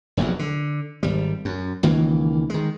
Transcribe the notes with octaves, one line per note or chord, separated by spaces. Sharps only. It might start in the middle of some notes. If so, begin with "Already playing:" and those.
F1 A#1 E2 F#3
D3
G#1 G3
F#2
C#2 D#3 E3 A#3
D#3 G#3